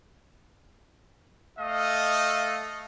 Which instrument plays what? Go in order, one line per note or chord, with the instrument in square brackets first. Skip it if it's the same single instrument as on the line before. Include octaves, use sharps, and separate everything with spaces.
[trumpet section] A3 D#5 F5